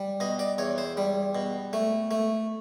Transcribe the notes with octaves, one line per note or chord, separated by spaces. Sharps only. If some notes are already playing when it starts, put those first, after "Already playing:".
Already playing: G3
B2 D#5
D5
E2 C#5
C5
G3
B2
A3
A3